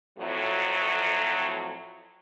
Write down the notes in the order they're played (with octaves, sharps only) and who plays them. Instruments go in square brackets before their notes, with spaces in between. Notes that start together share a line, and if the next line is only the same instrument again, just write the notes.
[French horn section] F2 A2 F#3